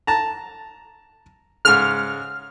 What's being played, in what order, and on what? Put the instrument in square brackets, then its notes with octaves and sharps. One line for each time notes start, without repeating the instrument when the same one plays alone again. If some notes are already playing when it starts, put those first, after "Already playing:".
[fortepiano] A5 A#5
[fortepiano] G#2 C#3 [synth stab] F6